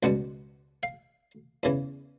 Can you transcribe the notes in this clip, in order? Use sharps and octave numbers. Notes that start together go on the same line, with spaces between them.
C#2 B2 G3 F#5
F5
E2 C#3 E3